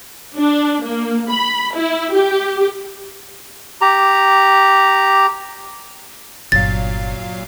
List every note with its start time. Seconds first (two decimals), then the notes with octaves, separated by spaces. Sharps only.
0.37 D4
0.83 A#3
1.30 B5
1.74 E4
2.13 G4
3.81 G4 A#5
6.52 G1 A#2 F#3 F5 A6